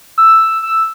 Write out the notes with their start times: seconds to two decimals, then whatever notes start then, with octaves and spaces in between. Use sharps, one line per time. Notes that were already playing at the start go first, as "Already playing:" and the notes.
0.18 E6
0.63 E6